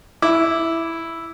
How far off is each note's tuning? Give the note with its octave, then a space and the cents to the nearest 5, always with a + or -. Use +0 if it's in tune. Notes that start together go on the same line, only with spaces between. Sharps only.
E4 +0 D6 +0